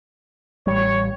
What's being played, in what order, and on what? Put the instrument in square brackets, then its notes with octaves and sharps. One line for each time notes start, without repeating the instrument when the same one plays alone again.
[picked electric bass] A1 G3 [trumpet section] C#5